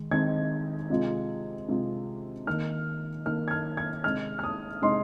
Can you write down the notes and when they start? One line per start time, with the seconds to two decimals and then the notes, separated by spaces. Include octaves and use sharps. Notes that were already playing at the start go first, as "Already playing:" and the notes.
Already playing: D#3 G#3
0.11 D#3 G#3 C4 D#4 G#6
0.90 C3 G#3 F4
1.68 C3 G#3 F4
2.46 D#3 A#3 D#4 F6
3.26 D#3 A#3 D#4 F6
3.48 G#6
3.51 F6
3.77 G#6
4.04 C3 G#3 D#4 F6
4.39 F6
4.44 D#6
4.82 C3 G#3 D#4 C6